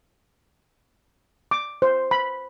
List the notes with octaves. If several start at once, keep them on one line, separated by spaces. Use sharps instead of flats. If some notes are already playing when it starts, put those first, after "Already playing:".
D6
C5
B5